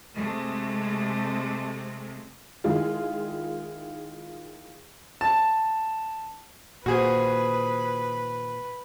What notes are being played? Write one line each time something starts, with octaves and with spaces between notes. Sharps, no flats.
C3 G#3 A3
D#3 G#3 E4 F4
A5
A#2 D#3 F#4 G#4 B4 C5